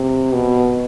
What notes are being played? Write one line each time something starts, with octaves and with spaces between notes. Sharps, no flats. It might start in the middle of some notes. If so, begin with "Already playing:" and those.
Already playing: C3
B2